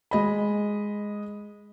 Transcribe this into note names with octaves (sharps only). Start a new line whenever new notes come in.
G#3 D#5 B5